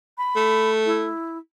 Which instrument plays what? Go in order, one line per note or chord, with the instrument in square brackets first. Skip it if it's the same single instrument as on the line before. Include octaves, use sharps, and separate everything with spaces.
[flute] B5
[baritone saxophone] A3
[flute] E4